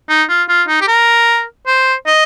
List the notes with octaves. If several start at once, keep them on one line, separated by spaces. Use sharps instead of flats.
D#4
F4
F4
D#4
G4
A#4
C5
D#5